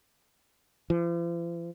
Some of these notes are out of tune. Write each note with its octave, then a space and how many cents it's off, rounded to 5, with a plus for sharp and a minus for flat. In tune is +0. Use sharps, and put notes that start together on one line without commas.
F3 -45